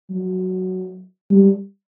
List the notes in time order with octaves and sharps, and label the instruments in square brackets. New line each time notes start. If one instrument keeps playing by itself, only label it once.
[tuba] F#3
G3